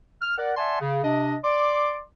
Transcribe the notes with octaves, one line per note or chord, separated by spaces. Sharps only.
F6
A#4 D5 F#5
D5 E5 F#5 G#5 A5 C6
C#3
C3 D4 D#5
D5 C6 D6